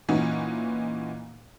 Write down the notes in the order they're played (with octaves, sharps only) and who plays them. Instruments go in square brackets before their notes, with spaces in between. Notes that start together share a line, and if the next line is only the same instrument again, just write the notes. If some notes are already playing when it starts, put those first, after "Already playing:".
[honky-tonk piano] A#2 E3 C#4 D#4 F#4